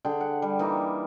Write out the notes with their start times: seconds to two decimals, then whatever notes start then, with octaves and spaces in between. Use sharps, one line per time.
0.05 D3 G#4 G5
0.21 F#5
0.42 G3
0.59 E3 A#3 D#4